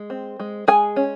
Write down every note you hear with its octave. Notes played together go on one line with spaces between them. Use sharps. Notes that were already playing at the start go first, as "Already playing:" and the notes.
Already playing: G#3
C4
G#3
G#3 G#4 G#5
C#4